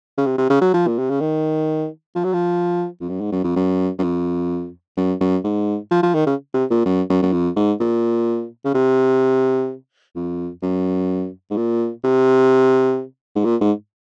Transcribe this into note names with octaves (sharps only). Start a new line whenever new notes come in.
C#3
C3
C3
C#3
F#3
F3
A#2
C3
C#3
D#3
F3
F#3
F3
F2
F#2
G#2
F#2
F2
F#2
F#2
F2
F#2
F#2
G#2
F3
F3
D#3
C#3
C3
A#2
F#2
F#2
F#2
F2
G#2
A#2
C#3
C3
F2
F#2
G#2
A#2
C3
G#2
A#2
G#2